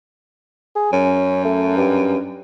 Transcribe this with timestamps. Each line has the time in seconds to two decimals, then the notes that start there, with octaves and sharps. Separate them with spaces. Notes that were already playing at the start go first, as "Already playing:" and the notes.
0.76 G#4
0.93 F#2 C#4
1.45 A3
1.77 G2